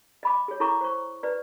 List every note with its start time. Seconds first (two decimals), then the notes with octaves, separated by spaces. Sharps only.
0.23 D#5 B5 D6
0.48 G#4 C#5
0.60 E4 A4 A#5 C#6 D6
0.81 C5 C#6
1.23 B4 D5